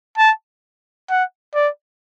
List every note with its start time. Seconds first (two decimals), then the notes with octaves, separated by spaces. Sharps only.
0.18 A5
1.10 F#5
1.55 D5